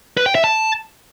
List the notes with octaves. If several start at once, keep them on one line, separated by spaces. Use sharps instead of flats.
B4
G5
E5
A5